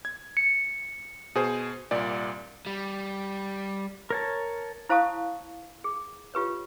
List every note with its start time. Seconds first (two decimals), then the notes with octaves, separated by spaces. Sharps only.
0.05 G#6
0.37 C#7
1.35 B2 G#4 C5
1.91 C2 A#2 D5
2.66 G3
4.10 A#4 C#5 A5
4.89 E4 C5 F5 A5 C#6 D#6
5.84 G#4
6.34 F4 G4 B4 C#5